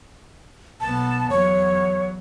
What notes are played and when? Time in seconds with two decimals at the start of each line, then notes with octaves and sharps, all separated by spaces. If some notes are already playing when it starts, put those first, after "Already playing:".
0.81 B1 B3 A5
1.30 E2 F#3 C#5